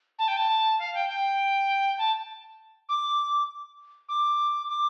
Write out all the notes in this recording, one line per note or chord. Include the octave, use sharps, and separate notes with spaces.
A5
G5
A5
F5
G5
G5
A5
D6
D6
D6